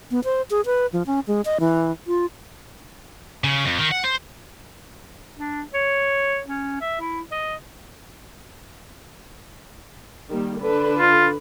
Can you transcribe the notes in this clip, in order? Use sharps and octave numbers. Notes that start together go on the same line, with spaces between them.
B3
C5
G#4
B4
F3
C#4
G#3
D#5
E3
F4
C#3
F2
D#3
F#5
C5
D4
C#5
C#4
E5
E4
D#5
D#3 G3 A#3
D3 D4 B4
F4